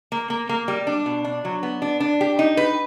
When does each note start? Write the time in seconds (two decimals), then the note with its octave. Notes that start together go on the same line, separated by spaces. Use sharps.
0.12 A#3
0.30 A#3
0.49 A#3
0.68 G3
0.87 D4
1.06 B2
1.25 D4
1.45 F#3
1.63 B3
1.82 D4
2.00 D4
2.21 G4
2.39 D#4
2.57 B4